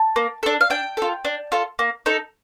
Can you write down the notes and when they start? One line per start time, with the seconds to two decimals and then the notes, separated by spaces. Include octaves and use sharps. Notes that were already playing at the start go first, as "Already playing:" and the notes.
Already playing: A5
0.16 A#3
0.43 D4 A4
0.61 F5
0.70 D4 G5
0.97 F4 A4
1.25 D4
1.52 F4 A4
1.79 A#3
2.06 D#4 A4